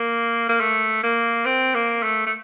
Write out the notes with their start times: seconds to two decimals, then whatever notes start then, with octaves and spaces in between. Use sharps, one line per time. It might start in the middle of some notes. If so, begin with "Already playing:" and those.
Already playing: A#3
0.49 A#3
0.61 A3
1.04 A#3
1.46 C4
1.75 A#3
2.03 A3
2.26 A3